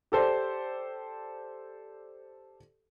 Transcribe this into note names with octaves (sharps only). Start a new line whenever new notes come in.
G4 A4 C5 D5